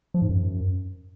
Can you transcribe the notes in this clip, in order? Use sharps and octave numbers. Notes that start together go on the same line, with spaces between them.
F3
G#2
F#2